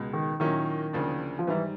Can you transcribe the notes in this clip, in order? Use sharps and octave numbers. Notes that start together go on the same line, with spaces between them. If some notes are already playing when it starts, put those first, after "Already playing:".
Already playing: C#2 B2 G#3 B3
D#3
A#2 D#3 F#3 A#3 C#4 E4
D2 C#3 F3 A#3 D4
F3
G#2 D#3 E3 G3